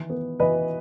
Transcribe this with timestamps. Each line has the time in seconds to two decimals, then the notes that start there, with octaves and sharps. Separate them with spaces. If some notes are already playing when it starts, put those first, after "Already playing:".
Already playing: D#3 E3
0.10 B3
0.40 E3 B4 D#5